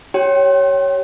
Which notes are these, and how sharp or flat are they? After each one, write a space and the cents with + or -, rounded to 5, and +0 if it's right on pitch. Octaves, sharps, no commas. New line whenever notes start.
G4 -25 C#5 +0 G5 +0